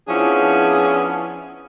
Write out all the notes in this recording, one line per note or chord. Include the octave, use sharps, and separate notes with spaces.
F3 B3 C#4 D4 E4 G#4